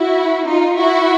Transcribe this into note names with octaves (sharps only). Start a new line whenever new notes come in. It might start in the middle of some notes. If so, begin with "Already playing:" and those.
Already playing: E4 F#4
D#4 F4
E4 F#4